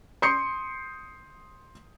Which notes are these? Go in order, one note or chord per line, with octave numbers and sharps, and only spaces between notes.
C6 D#6 G6 C7 C#7